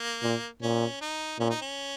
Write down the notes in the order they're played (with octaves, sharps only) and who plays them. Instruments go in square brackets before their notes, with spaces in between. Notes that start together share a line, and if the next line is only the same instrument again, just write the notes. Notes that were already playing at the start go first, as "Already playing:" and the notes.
Already playing: [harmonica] A#3
[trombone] A#2
[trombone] A#2 [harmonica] C#4
[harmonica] D#4
[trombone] A#2 [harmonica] C#4
[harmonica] D#4
C#4